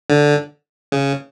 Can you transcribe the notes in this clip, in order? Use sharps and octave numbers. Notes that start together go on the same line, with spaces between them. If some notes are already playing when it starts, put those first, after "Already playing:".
D3
C#3